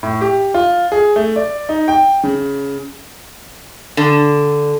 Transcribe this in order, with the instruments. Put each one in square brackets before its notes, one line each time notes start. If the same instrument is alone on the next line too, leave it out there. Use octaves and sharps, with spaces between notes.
[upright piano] A2
G4
F4
G#4
A3
D5
D#4
G5
C#3
[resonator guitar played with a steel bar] D3